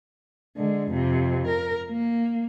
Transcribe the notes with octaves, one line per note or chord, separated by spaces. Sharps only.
D3 G#3
F2 C3
A#4
A#3